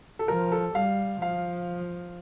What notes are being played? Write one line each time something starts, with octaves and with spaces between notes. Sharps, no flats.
A4
F3 A#4
A4
G3 F5
F3 F5